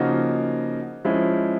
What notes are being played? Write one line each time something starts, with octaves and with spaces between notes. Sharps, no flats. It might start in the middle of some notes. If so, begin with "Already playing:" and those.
Already playing: C#3 F3 A#3 D#4 F#4
F3 G#3 C#4 E4 G#4